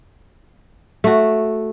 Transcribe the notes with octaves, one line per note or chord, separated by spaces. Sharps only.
A3 F#4